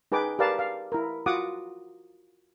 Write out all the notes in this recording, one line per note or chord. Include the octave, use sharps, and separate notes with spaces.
D#4 G#4 B4 G5 D6
G4 A#4 B4 D5 F5 A5
F5
E4 A#4
F4 F#4 F#5 D6 D#6